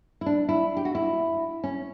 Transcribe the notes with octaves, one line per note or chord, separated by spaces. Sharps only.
E4
D4
E4
G4
F#4
E4
C#4